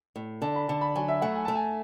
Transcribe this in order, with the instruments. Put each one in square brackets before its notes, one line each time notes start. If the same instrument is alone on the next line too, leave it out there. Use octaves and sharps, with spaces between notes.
[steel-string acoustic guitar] A2
[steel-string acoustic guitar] D3 [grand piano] A5
[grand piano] B5
[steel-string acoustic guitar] D3 [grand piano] A5
[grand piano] B5
[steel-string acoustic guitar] F#3 [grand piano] G#5
[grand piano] E5
[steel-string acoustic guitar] A3 [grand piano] F#5
[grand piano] G#5
[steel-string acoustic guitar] A3 [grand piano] A5
[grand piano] G#5